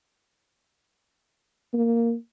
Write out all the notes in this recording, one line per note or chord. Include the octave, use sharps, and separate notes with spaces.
A#3